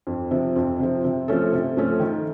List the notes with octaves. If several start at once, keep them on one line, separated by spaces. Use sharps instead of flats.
F2
C3 F3
F2
C3 F3
C3
F3 A3 C#4 A4
C3
F3 A3 C#4 A4
D#3